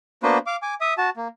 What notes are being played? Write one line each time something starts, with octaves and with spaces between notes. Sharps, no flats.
A#3 B3 D4 F#4 B4 C5
F5 D6
G#5 D6
E5 D#6
F#4 A5
A#3